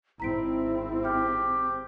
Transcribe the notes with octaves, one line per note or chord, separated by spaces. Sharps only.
G#1 C4 E4 A#5 B6 D7
G4 G5 F6